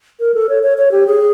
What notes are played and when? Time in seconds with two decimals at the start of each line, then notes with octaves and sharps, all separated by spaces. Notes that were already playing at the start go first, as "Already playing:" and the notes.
0.20 A#4
0.34 A4
0.49 C#5
0.63 C#5
0.78 C#5
0.92 G4
1.07 G#4